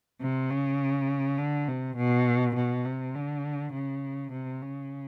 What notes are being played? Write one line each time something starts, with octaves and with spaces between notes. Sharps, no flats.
C3
C#3
D3
C3
B2
B2
C3
D3
C#3
C3
C#3